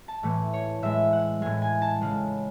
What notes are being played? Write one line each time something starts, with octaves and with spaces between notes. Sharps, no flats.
A5
A2 E3 A3
C#5
A2 G#3 E5
F#5
A2 G#3 G#5
G#5
A5
C#3 G#3